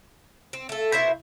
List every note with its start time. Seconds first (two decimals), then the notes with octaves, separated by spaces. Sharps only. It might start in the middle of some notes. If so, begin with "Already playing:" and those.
0.53 C4
0.69 A3 A4
0.92 B2 E4 C5 E5